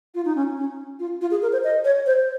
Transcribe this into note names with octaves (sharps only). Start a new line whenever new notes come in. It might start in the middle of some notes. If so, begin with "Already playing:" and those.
F4
D#4
C#4
C#4
F4
F4
G#4
A#4
C5
D#5
C#5
C5